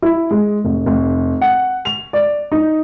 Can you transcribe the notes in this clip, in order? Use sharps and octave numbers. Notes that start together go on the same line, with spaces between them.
E4
G#3
F1
F1
F#5
F7
D5
D#4